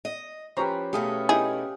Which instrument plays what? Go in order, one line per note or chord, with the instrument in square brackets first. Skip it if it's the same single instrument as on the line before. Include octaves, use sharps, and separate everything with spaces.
[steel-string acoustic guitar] D#5
[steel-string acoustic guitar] F3 [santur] C#4 G4 B4 [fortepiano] C5 A#5 C#6
[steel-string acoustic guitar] B2 A3 C#4 [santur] G4 G#4 F5
[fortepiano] D#4 E4 [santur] G4 [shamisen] G#4